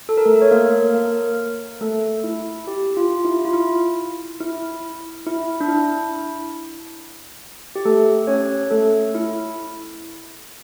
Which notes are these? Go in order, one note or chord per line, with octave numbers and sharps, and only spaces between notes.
A4
A#4
A3 A4
C#5
A#3 A#4
A#3 A#4
A3 A4
E4
G4
F4
E4
F4
E4
E4
E4
D4
E4
G4
A3 A4
C#4 C#5
A3 A4
E4